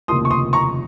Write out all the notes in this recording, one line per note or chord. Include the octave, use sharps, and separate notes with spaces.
F1 D#2 C#3 F3 A#3 C6 D#6
C#6
C6 D#6
A#5 C#6